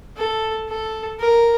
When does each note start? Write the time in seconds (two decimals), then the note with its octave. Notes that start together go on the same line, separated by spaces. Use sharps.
0.17 A4
0.69 A4
1.19 A#4